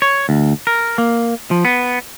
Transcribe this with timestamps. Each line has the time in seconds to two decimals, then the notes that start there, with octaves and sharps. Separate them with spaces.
0.02 C#5
0.29 D2
0.67 A#4
0.98 A#3
1.51 F3
1.65 B3